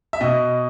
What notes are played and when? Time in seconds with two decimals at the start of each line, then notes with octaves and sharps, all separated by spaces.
0.13 E5
0.21 B2 D#5